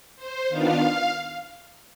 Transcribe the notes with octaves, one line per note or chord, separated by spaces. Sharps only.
C5
D#3 B3 D4 F4 F5